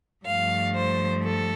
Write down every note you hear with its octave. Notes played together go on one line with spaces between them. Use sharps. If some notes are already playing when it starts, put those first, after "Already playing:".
G2 F3 A3 F5
C5
A4